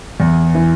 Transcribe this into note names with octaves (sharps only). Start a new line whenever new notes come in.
E2
E3